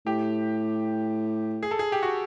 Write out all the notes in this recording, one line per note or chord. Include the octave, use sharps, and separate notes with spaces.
A2 G4
G#4
A4
G#4
G4
F#4